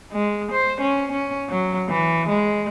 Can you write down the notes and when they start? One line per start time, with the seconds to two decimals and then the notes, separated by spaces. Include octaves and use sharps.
0.12 G#3
0.52 C5
0.81 C#4
1.12 C#4
1.49 F#3
1.89 E3
2.29 G#3